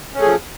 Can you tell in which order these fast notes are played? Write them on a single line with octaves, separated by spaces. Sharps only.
C#4 A3 G#4 F3